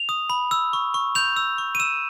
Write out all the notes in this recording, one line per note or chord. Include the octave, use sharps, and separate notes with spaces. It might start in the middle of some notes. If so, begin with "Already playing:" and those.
Already playing: F7
D#6
B5
E6
C#6
C#6
G6 F7
E6
C#6
D#7
E6 E7